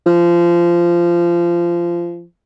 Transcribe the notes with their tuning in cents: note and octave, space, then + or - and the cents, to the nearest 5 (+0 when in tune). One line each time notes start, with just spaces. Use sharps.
F3 -20